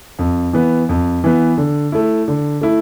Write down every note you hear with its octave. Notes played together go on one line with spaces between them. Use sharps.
F2
E3 B3
F2
E3 B3
D3
A3 E4
D3
A3 E4